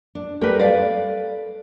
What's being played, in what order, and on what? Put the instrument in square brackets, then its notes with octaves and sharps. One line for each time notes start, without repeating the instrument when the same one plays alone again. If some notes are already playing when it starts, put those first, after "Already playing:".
[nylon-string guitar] D4
[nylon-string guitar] G3 A3 G4 [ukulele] A#4 B4
[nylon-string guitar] A4 F5 [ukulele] D5